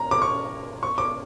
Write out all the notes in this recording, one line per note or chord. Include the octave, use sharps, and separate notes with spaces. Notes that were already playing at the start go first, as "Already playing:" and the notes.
Already playing: A#5
D6
C#6
C#6
D6